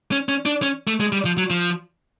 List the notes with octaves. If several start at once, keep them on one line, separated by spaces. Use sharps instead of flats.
C#4
C#4
D4
C#4
A3
G#3
G3
F3
F#3
F3